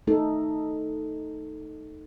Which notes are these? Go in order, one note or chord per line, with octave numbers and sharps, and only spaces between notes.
A3 D#4 A4